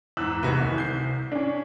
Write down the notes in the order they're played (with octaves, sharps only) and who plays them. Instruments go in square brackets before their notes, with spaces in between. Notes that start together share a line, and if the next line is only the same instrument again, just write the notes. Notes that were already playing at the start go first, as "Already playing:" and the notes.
[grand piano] E2 G#2 [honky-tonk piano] E6 F#6
[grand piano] F1 F#4 B4 [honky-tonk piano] C2
[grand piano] D1 D#3
G6 C7
[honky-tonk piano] C#4 D4